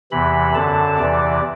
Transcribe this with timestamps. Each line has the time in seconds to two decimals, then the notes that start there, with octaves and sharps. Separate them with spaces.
0.11 E2 C3 E3 B5
0.55 F#2 D3 A5
0.98 E2 C3 E3 D5